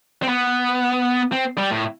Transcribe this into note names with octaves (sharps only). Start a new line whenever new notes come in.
C4
B3
C4
G3
A2